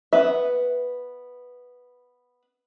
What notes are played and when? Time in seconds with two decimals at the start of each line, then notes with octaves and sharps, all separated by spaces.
0.13 B3 B4 E5